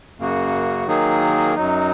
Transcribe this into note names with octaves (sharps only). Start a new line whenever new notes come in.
F#2 C#3 A#3 F#4
D#3 F#3 A#3 D#4 G#4
F#2 F#3 D#4